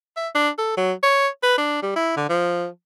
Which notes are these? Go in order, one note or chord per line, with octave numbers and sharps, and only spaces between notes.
E5
D4
A4
F#3
C#5
B4
D4
G3
E4
D3
F3